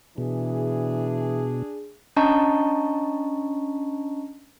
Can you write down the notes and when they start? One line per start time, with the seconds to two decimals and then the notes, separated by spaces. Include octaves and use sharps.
0.18 B2 E3 D4 G#4
2.16 C#4 D4 D#5 A5 A#5 C#6